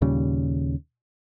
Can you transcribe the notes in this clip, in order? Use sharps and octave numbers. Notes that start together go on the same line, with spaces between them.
D#2 A#2 C#3 G3